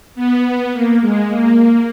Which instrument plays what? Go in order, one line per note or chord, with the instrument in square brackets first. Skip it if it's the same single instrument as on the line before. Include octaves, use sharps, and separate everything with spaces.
[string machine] B3
A#3
G#3
A#3